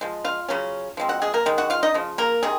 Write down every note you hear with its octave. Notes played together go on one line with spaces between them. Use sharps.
F3 G#3
F4 F5
C#3 F#3 C#4
F3 G#3 C4
F#4 F#5
G#3 G#4
A#3 A#4
D#3 G#3
F#4 F#5
F4 F5
D#4 D#5
C#3 F3
A#3 A#4
C3 D#3 G#4